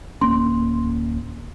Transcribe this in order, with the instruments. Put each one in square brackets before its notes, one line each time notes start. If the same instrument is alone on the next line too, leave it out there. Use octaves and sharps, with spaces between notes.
[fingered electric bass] D1 A#3 C#4 [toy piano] C6